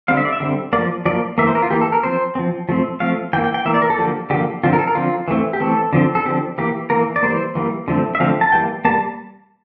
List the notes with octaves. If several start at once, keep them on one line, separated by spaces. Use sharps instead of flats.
D3 G3 C4 F5
E5
D5
E5
D3 G3 C4
A#3 D5
F3
F3 A#3 D5
E3 A#3 E5
C5
A#4
F4
E3 A#3 G4
A4
A#4
F3 C4 C5
F3 C4
F3 A3 C4
F3 A3 C4 F5
E3 A#3 G5
G5
G5
E3 A#3 E5
D5
A#4
A4
D3 F3 A#3 G4
D3 F3 A#3 G4
D3 F3 C4 F4
A#4
A4
A#4
D3 F3 C4 F4
E3 A3 C4
G4
E3 A3 C4 A4
D3 F3 C4
A4
D3 F3 C4 G4
E3 A#3 G4
E3 A#3 A#4
D5
E3 G3 A#3 C5
E3 G3 A#3
D3 F3 A3 C4
E5
D3 F3 A3 C4 F5
A5
E3 G3 A#3 G5
G3 A#3 A5